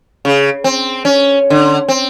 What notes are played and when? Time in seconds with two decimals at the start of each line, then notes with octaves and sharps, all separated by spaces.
0.25 C#3
0.64 C4
1.05 C#4
1.50 D3
1.88 C4